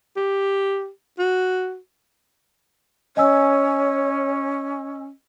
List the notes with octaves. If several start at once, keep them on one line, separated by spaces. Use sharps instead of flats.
G4
F#4
C#4 C#5 D#5 G#5 E6